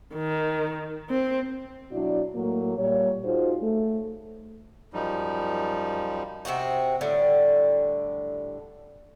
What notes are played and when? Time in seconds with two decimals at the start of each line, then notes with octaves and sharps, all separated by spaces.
0.15 D#3
1.10 C4
1.92 B2 F#3 D4 E4 F#4 D5
2.35 A2 F#3 A3 A#3
2.77 A#2 G3 C#5
3.25 D#4 F4 F#4 G#4 C5
3.62 A3
4.93 F#2 F3 G3 D#4
6.45 C3 C4 D#4 F#4
7.01 A2 D3 G3